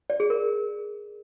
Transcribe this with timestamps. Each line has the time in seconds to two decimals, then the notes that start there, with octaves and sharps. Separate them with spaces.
0.10 D5
0.20 G#4
0.30 A#4